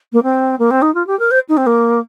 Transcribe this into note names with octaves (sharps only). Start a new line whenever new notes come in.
A#3
C4
A#3
C4
D#4
F4
G4
A#4
C5
D#4
C4
A#3